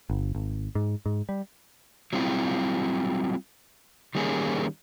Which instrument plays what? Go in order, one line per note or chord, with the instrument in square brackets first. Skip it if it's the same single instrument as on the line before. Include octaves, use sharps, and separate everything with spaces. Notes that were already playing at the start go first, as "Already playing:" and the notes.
[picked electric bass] G1
G#1
G#2
G#2
G3
[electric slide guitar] F#3 G3 C4 E4 F4
D#3 G3 A#3 C#4 G#4